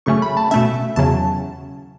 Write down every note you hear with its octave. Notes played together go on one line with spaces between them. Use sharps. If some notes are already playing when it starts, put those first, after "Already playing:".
F#2 C#3 A3 C#4 C#6
B5
A5
B2 A3 C#4 E5
E2 C#3 F#3 C#4 A5